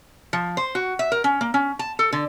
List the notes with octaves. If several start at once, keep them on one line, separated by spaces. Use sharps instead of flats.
F3
C5
F#4
E5
A#4
C#4
A#3
C#4
A5
A4
D3